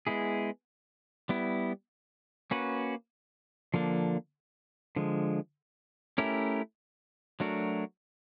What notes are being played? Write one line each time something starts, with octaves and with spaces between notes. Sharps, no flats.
G#3 B3 E4 G#4
G3 B3 E4
A#3 C#4 F#4 B4
D3 F3 A#3 D4
D3 F3 G#3
A3 C#4 E4 G4 A#4
F#3 A3 D4 F#4 A#4